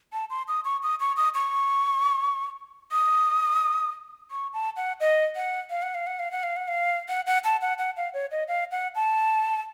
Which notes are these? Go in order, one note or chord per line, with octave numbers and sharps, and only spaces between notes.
A5
C6
D#6
C#6
D#6
C#6
D#6
C#6
D#6
C#6
A5
F#5
D#5
F#5
F5
F#5
F5
F#5
F5
F#5
F5
F#5
F5
F#5
F#5
A5
F#5
F#5
F5
C#5
D#5
F5
F#5
A5